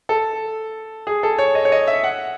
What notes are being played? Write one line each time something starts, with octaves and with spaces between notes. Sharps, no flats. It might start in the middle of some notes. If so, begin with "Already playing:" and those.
A4
G#4
A4
C#5
D#5
C#5
D#5
E5
F#5